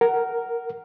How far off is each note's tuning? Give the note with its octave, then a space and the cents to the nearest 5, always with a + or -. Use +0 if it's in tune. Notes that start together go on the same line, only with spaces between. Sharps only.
A#4 +0 F#5 +15